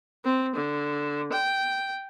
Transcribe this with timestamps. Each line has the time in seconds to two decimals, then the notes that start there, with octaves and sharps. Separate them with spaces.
0.25 C4
0.56 D3
1.32 G5